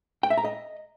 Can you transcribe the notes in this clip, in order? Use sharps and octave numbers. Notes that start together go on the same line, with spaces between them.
G5
E5
A#5
D#5